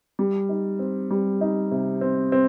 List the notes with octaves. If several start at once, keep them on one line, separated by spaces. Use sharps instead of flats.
G3
D#4
C4
G3
D#4
C3
C4
C4